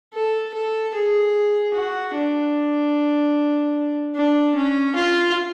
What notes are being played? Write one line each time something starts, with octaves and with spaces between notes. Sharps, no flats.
A4
A4
G#4
F#4
D4
D4
C#4
F4